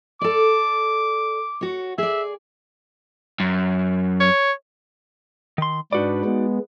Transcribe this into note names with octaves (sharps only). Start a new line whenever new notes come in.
A4 D5 D6
F#4 C#5
G#4 D5 E5
F#2
C#5
D#3 C6
G#2 D4 D#4 F#4 B4 D5
G#3 B3